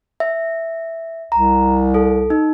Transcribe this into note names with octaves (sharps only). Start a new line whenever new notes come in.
E5
C2 A#5
A4
D#4